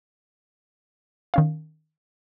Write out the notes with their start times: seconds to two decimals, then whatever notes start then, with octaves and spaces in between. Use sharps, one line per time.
1.34 D#3 C#4 F5